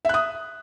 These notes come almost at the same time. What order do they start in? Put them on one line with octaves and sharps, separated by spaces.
E5 F#6 D#6